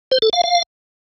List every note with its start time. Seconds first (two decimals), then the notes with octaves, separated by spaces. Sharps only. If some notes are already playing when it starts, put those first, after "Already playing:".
0.12 C5
0.22 A4
0.33 F5
0.44 F5